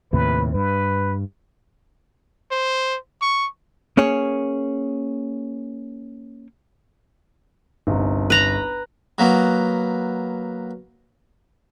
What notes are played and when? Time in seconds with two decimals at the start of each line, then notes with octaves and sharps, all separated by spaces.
0.13 D#2 A2 C3 B4
0.54 G2 B4
2.51 C5
3.22 C#6
3.97 A#3 C#4 G#4 C#5
7.87 G1 C2 D#4
8.30 B4 A#5 B5
9.18 F#3 A#3 B3